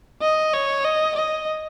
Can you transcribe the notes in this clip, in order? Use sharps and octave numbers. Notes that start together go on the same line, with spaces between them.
D#5
C#5
D#5
D#5